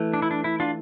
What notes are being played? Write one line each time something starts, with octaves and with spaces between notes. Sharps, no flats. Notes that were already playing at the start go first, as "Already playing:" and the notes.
Already playing: E3 A3
D4
E4
D4
E4
D4 F4